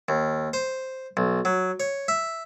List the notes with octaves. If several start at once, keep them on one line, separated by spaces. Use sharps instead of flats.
D#2
C5
B1
F#3
C#5
E5